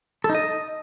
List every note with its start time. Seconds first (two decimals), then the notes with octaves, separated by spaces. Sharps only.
0.24 A4
0.29 D#4
0.35 D#5